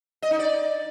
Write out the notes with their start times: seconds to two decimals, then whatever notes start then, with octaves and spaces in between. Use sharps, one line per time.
0.22 D#5
0.31 D#4
0.39 D5